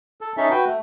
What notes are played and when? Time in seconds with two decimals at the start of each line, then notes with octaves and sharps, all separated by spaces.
0.21 A4
0.37 C#4 D#4 A4 E5
0.51 F#4 B4 G5
0.66 A3